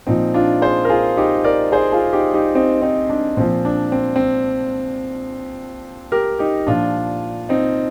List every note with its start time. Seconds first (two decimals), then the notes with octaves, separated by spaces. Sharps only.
0.07 A#2 F3 C4 D#4
0.34 D4 F4
0.61 G#4 C5
0.85 A#4
0.90 F4 G#4
1.17 D#4 G4
1.44 A#4 D5
1.72 G#4 C5
1.93 F4 G#4
2.13 D#4 G4
2.34 D#4 G4
2.55 C4 D#4
2.82 C4 D#4
3.10 D4
3.37 A#2 F3 C4
3.65 D4
3.92 C4
4.16 C4
6.12 G4 A#4
6.39 D#4 G4
6.67 A#2 F3 D4 F4
7.49 C4 D#4